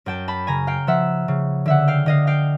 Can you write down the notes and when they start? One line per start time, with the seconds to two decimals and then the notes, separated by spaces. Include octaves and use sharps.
0.06 F#2 G5 A5
0.28 A5 B5
0.47 C#3 G#5 A#5
0.67 F5 G5
0.87 F3 E5 F#5
1.28 C#3
1.66 D3 E5 F#5
1.88 F5 G5
2.06 D3 D#5 F5
2.27 F5 G5